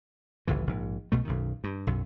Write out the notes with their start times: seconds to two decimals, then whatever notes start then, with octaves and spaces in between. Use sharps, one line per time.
0.47 G1 C#2 A2 E3
0.67 A#1 G#2
1.12 B1 B2 A3
1.25 B1 F#2 D#3
1.64 G2
1.87 B1 F#2